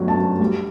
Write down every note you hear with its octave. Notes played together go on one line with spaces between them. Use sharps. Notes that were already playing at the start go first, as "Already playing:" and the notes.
Already playing: G1 F#3 A3
A5
F#2
G3